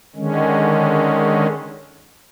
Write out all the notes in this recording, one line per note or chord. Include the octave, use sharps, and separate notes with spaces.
D3 D#3 G#3 C#4